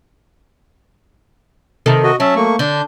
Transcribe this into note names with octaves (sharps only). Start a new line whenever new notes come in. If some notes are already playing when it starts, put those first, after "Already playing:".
C3 D#3 A4
F#4 D#5
F#3 C#4 E5 A5
A3 A#3 C#6
D3 D4 G6